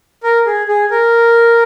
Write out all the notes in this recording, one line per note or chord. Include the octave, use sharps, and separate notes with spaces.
A#4
G#4
G#4
A#4